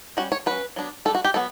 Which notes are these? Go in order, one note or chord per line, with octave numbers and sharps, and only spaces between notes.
G3 C#4 F#4
C#5
F#3 C#4 B4
F#3 B3 D4
G3 D4 A4
F#4
G4
F#3 B3 A4